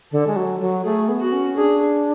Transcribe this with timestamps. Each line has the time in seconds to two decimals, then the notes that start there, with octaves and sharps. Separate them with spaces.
0.12 D3 A4
0.27 G#3
0.36 F#3
0.60 F#3
0.85 A3 G#4
1.08 B3
1.20 F#4
1.32 C#4
1.57 D4 G#4